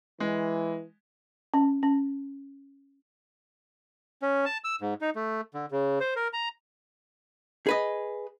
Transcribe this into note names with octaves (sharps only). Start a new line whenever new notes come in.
E3 G#3
C#4
C#4
C#4
A5
E6
G#2
D#4
A3
D3
C#3
C5
A#4
A#5
G#4 B4 D#5